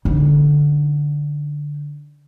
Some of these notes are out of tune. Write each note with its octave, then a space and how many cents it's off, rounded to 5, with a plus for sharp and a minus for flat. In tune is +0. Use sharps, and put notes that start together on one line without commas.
D3 +0 D#4 +0